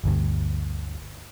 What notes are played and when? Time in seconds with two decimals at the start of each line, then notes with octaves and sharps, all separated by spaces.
0.04 G1 D2 G2